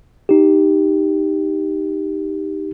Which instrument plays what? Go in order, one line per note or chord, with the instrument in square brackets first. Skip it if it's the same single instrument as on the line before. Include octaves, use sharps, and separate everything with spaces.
[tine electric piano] D#4 G4